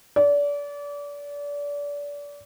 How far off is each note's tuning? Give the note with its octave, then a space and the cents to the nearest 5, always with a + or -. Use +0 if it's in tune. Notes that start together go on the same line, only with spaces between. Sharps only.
D5 -30